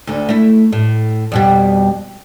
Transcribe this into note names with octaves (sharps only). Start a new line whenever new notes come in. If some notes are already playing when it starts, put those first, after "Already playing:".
D2 D3
A3 E4
A2
F2 B2 G3